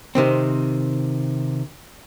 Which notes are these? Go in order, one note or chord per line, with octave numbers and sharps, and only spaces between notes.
C3 D#3 C4